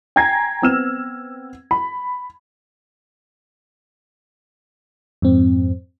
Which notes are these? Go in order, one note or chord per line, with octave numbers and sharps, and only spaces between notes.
G5 G#5 A#5 G#6 A#6 C7
B3 C4 E6 F6 E7
B5
F2 G#2 C4